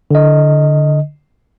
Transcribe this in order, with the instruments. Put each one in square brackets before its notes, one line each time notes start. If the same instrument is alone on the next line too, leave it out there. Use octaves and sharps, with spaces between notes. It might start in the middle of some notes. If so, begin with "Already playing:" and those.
[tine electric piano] D3 D#5